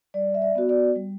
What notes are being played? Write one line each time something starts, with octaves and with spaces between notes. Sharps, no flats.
G3 D5
E5
D5
B3 F#4
D5
G3